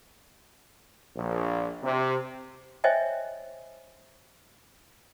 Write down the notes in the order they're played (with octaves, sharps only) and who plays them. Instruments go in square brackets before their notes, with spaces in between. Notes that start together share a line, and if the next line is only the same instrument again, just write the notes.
[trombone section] A#1
C3
[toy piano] C5 C#5 D#5 E5 G5 G#5